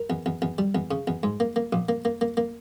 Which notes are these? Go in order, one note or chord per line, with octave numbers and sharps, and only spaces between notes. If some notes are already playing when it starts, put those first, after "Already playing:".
Already playing: A#4
E2
E2
E2
G3
E2
C#3
E2
G#2
A#3
A#3
A#1
A#3
A#3
A#3
A#3